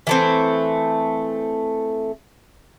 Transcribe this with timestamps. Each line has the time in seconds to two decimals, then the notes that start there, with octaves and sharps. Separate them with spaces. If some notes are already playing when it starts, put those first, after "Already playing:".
0.07 E3 A3 C4